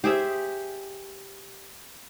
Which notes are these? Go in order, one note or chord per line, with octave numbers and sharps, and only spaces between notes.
G4 G#4 C5 E5